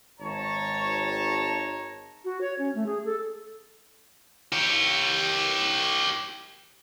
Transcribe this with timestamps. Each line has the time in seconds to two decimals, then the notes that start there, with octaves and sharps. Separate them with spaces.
0.20 G#1 C#5 A5 A#5
2.25 F#4
2.41 C#5
2.59 C#4
2.75 A3
2.86 G#4
3.05 A4
4.52 G4 C#5